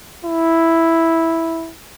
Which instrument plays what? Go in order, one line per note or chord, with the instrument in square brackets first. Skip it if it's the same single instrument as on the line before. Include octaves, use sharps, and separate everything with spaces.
[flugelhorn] E4